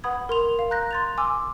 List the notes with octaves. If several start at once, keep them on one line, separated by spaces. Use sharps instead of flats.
B4 F#5 B5 D#6 G#6
A#4 C6 F7
F5
A#5 F#6 G6 A#6
C6 A6 F7
G#5 C6 D6 E6 F6